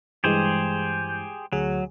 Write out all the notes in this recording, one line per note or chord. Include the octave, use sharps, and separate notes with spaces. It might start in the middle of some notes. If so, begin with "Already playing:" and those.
G2 E3 G#3 G4 G#4 C5
D2 F#3 G#4